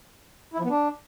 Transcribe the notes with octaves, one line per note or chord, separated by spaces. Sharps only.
E4
F3
B3
D4